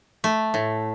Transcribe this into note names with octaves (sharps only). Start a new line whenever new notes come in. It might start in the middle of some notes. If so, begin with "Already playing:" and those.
A3
A2